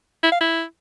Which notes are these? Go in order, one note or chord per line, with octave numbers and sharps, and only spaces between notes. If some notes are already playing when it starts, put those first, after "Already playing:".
E4
F5
E4